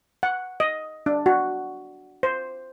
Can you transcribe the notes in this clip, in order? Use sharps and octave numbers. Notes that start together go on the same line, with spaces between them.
F#5
D#5
D4
F#4
C5